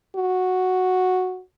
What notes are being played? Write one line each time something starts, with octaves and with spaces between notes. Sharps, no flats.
F#4